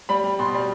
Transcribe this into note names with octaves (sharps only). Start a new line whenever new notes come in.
G3 B5
G3
B2 C6
G3